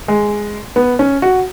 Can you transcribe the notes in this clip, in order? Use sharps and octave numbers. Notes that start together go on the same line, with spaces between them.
G#3
B3
C#4
F#4